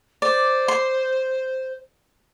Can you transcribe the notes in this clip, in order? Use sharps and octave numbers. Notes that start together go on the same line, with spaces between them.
C5 D5
C6